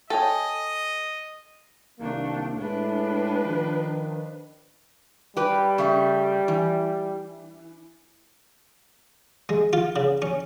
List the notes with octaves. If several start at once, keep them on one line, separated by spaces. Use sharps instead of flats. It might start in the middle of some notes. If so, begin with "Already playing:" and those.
A4 C#5 D#5 G5 G#5
C2 D#3 A3 A#3 D4
A2 G#3 A3 D4 B4
D#3 F3
G3 G4 B4
C#3 A3 E5
E3
G#3
F4
C#3
C#4